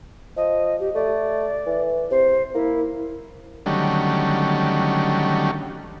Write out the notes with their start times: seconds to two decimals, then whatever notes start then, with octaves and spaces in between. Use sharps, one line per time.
0.37 F3 D#5
0.80 G4
0.95 A3 D5
1.66 E3
2.11 C3 C5
2.54 A#3 E4
3.66 D3 D#3 F#3 G3 A3 C#4